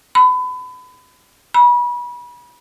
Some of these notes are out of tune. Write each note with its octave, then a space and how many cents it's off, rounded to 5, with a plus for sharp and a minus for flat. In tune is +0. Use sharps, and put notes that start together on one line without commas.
B5 +30
B5 -30